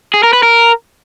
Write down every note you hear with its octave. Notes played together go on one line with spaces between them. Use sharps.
G#4
A#4
B4
A#4